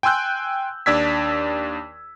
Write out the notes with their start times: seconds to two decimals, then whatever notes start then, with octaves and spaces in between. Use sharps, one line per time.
0.03 G5 G#5 C6 E6 F#6 G6
0.86 D#2 D4 D5 E6 G#6 B6